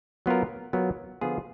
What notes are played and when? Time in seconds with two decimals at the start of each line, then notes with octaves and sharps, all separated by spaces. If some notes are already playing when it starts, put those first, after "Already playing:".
0.26 F#3 B3 F4 A#4
0.73 F#3 B3 F4 A#4
1.21 D3 F3 B3 F4 G#4